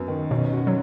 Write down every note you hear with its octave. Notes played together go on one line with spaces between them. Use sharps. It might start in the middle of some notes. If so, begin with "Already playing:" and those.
Already playing: F#2 B3
D#3
B2 C#4
F#4
F#3